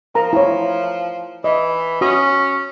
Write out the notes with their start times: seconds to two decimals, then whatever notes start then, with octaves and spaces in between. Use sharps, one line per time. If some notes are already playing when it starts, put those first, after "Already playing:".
0.15 F3 A#4 A#5
0.33 E4 C#5
1.44 E3 D#5
2.01 C#4 F#4 D#6